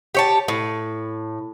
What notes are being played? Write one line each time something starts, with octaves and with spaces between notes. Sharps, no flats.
G4 C#5 A5
A2